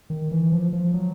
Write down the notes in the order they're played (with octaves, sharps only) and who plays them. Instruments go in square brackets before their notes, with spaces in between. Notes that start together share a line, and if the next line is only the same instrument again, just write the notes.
[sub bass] D#3
E3
F3
F3
F#3